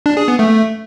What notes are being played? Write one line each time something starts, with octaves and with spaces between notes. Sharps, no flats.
D4
G#4
B3
A3